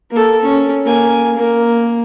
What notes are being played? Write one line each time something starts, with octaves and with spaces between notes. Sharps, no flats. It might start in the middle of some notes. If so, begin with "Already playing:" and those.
A#3 A4
C#4
A#3 G#5
A#3